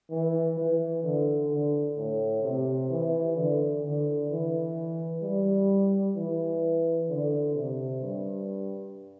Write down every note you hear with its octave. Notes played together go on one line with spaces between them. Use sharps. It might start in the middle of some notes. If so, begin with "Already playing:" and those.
E3
E3
D3
D3
A2
C3
E3
D3
D3
E3
G3
E3
D3
C3
G2